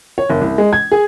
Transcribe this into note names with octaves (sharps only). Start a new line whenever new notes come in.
C#5
F#1
C2
G#3
G#6
G#4